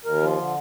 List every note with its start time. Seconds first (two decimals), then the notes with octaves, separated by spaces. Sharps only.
0.05 D#2 A#4
0.21 F3
0.37 D3